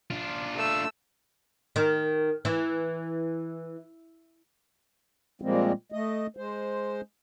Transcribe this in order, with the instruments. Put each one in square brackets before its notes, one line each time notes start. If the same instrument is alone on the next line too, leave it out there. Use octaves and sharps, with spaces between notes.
[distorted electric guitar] D4 F4
[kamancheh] A3 E6
[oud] D#3
E3
[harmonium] A#2 F3 G3 G#3 A#3 C4
A3 D#5
G#3 C5